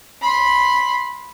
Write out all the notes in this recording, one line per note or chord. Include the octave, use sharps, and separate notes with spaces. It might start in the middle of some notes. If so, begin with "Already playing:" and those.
B5 C6